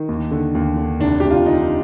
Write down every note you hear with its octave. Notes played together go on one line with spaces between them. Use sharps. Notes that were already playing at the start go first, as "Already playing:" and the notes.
Already playing: D#3
D#2
D3
D#2
D3
F1 D4
F1 G4
F4
D3 D#4